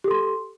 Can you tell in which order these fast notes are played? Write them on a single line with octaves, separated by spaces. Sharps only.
G4 A4 C6